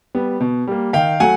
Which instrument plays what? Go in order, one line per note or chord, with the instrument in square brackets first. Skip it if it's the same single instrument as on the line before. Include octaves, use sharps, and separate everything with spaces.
[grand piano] G3 B3
B2
G3 A#3
D#3 F5 G5
F#3 A3 F#5 G#5